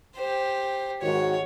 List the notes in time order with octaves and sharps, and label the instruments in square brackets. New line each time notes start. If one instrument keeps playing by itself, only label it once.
[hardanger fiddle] G4 C5
[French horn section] G#2 D#3 F#4 [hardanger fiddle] C#5